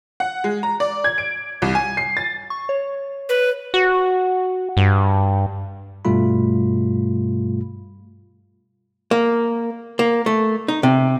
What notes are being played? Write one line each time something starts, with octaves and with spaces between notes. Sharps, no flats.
F#5
G#3
A#5
D5
G#6
D7
C2
G#5
C7
A6
C#6
C#5
B4
F#4
G2
G2 B2 G3 A3 F4 B5
A#3
A#3
A3
D#4
C3